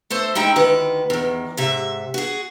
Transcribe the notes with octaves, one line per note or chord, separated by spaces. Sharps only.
A3 A4 C5
G#3 D#4 E4 G5
D2 D#3 B4
E2 D#3
G#2 C3 E5
F#4 G#4